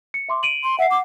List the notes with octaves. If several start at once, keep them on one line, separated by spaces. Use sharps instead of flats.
C#7
E5 C6 D6
D7 D#7 F#7
C6
E5 F#5 C7
D6